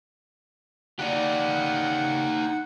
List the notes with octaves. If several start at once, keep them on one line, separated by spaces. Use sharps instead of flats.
C#3 D#4 G4 D5 F#5